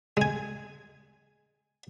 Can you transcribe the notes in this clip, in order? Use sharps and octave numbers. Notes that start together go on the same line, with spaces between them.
G#3 G#5